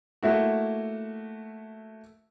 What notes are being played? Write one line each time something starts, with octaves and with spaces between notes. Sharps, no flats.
A3 A#3 E4 F#4